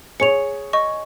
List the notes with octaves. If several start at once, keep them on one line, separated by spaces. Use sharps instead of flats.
G#4 C#5 C#7 F7
D#5 C#6